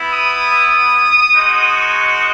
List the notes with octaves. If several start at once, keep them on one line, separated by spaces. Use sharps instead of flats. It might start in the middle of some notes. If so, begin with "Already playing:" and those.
Already playing: B3 E4
D#6
G#3 D#4 F#4
C#6